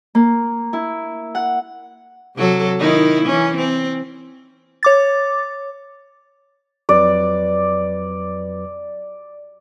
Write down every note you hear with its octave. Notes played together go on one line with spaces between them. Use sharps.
A#3
E4
F#5
C3 F#3 A4
D#3 D#4 E4
E3 C#4
C4
C#5 D6 A6
F2 F#3 B4 D5